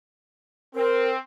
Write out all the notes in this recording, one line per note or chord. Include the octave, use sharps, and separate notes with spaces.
C4 A#4